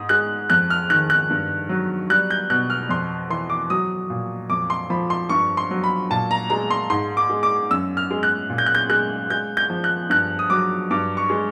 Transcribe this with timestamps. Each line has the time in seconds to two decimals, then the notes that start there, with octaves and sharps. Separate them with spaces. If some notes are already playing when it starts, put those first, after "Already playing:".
Already playing: G#2 D#6
0.09 G#3 F#6
0.50 F2 F#6
0.70 F6
0.90 D#3 F#6
1.10 F#6
1.30 G2
1.69 F#3
2.10 G3 F#6
2.31 G6
2.50 B2 F#6
2.70 F6
2.89 F2 C6
3.30 E3 C6
3.50 D6
3.70 F#3 D#6
4.10 A#2
4.50 F2 D6
4.70 C6
4.90 F3 B5
5.10 C6
5.29 G2 C#6
5.57 C6
5.71 F#3
5.84 B5
6.11 A#2 A5
6.31 A#5
6.50 G#3 A#5
6.71 C6
6.90 G#2 C6
7.17 D6
7.30 G#3
7.43 D6
7.71 F#2 E6
7.97 F6
8.11 G#3
8.23 F#6
8.50 A#2
8.58 G6
8.66 F#6
8.75 G6
8.90 G#3 F#6
9.30 G#3 G6
9.57 G6
9.70 F3
9.84 F#6
10.10 G2 F#6
10.39 D#6
10.50 F#3 D6
10.90 G2 D6
11.17 C#6
11.30 G#3